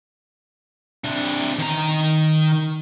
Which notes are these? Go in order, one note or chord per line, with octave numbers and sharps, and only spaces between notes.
C3 D4
D#3 A#5